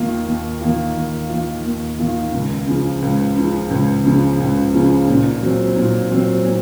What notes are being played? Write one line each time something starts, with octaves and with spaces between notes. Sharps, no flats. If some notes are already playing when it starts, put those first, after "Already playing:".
Already playing: D#2 D#3 A#3 F4
D#2
D#3 A#3 F4
D#2
D#3 A#3 F4
D#2
D#3 A#3 F4
C#2
C#3 F3
C#2
C#3 F3
C#2
C#3 F3
C#2
C#3 F3
A#2
F#3 C4
A#2
F#3 C4
A#2